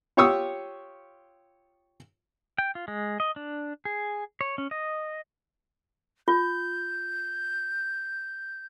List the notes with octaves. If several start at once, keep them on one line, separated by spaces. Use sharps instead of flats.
F4 G4 C#5 C#6 D#6 E6
G5
F4
G#3
D#5
D4
G#4
C#5
C#4
D#5
F4 G6